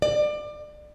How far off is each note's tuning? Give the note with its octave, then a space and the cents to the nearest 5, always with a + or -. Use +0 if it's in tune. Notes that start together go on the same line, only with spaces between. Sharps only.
D5 +25